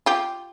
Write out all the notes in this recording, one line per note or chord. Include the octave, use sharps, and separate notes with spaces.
F4 G4